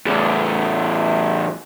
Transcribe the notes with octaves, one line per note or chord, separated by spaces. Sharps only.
E2 A2